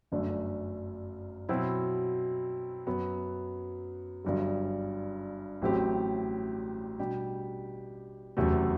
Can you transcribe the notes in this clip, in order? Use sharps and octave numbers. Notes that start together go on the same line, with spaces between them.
G1 F#2 F#3 A3 D4
B2 F#3 C4 E4
F#2 F#3 B3 F#4
G1 G2 F#3
A1 A2 F#3 C4 G4
B2 G3 D4 G4
F#1 E2 C3 F#3 A3